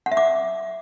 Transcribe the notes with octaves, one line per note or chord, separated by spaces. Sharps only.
F#5
E5
D6